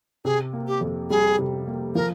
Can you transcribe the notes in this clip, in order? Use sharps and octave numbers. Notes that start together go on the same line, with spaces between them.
C3 G#4
A#3
G4
F2
G3 G#4
C3
A#3
F3 A#4